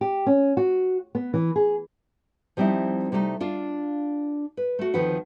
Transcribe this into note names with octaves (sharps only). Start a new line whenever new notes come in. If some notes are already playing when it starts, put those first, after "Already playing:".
G4
C#4
F#4
B3
E3
G#4
F3 G3 C4 D#4 E4 D#5
C3 G3 A3 C#4 D#4
D4 F4 F5
B4
A3 F#4
D2 D#3 F3 C4 B4 F#5